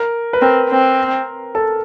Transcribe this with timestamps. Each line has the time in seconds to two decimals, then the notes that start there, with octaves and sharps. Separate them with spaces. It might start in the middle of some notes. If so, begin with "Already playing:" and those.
Already playing: A#4
0.33 B4
0.42 C4 A#4
0.70 C4
1.55 A4